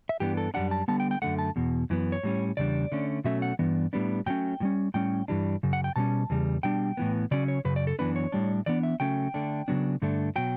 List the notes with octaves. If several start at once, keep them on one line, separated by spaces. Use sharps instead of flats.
E5
G2 E3 B3 D4 G4
A4
F#2 E3 G3 D4 F#5
A5
D3 G3 B3 A5
G5
G5
F#2 D3 A3 F#5
A5
E2 B2
F#2 E3 B3
C#5
A2 G3 C#4
E2 C#3 G3 D4 D5
D3 A3 C#4
B2 F#3 A3 C#4 E5
F#5
G2 E3 B3 D4
A2 G3 B3 D4
A2 F#3 A3 C#4 G5
A2 G3 C#4
A2 G3 C#4 G5
G2 E3 G3 D4
F#2 C#3
F#5
G5
B2 G3 C#4 A5
E2 C#3 G3
B2 G3 D4 G5
A2 E3 B3
C#3 F#3 C#4 D5
C#5
F#2 C#3 B4
D5
A4
F#2 E3 B3 D4 B4
C#5
A2 G3 D4
A2 E3 B3 D4 D5
E5
C#3 F#3 A3 C#4 G5
D3 A3 D4
C#3 F#3 B3 D4
G2 D3 A3 D4
B2 F#3 G5